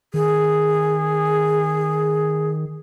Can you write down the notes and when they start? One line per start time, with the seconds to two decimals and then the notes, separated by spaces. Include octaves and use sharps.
0.14 D#3 G#4